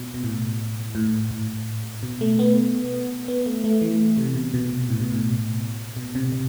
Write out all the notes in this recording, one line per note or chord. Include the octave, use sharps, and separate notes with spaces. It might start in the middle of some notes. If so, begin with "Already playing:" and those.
Already playing: B2
B2
A2
A2
A2
B2
A3
B3
B3
A3
A3
E3
C3
B2
B2
A2
B2
A2
B2
C3
C3